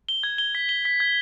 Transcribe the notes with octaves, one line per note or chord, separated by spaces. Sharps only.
G7
G#6
G7
B6
G7
B6
G#6